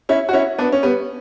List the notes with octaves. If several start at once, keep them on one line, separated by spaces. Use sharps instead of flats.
C#4 E4
F#4
C#4 E4
B3 D4
C#4
G3 B3